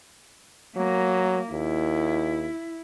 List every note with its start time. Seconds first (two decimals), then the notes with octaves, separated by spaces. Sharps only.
0.76 F#3 A#3
1.52 D#2 E4